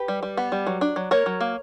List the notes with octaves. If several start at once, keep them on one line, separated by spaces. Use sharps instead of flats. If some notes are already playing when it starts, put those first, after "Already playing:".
Already playing: G4 B4
G3
G3
B3
G3
F#3
D4
F#3
A#3 A#4 C#5
F#3
A#3